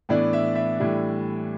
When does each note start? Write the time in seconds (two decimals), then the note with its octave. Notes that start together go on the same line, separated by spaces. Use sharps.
0.09 A2 E3 B3 D4 D5
0.33 E5
0.55 E5
0.80 A2 E3 G3 D4